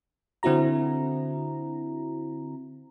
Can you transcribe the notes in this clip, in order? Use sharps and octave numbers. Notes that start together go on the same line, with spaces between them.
D3 C4 E4 F#4 A#5